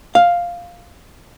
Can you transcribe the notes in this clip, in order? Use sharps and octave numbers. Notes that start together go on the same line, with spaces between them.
F5